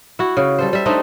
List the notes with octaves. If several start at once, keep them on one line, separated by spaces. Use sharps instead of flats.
E4 F#4
C#3
G3 A4 C5
G3 E5
A3 C4 D4 D#4